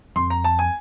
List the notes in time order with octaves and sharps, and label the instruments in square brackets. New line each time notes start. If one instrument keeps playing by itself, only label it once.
[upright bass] F2 [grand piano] C6
[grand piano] A#5
A5
G#5